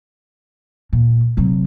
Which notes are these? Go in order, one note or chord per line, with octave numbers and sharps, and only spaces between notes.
A#2
C3 F#3